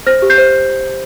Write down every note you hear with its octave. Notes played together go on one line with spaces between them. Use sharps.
C5 F6 A#6
G4
G6 C7
C5